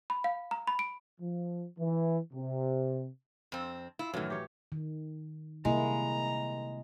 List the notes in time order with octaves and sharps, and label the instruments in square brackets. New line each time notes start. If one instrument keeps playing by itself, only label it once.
[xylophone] B5
F5
A#5
B5
D7
[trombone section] F3
E3
C3
[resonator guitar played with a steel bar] F2 C4
[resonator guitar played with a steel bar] E4 [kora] F4 F5
[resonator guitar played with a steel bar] F#2 D#3 [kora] A2 E3 F#3
[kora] G4 C#5
[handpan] D#3
[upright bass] C3 [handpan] G3 A#3 E4 [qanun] G#3 [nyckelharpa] A#5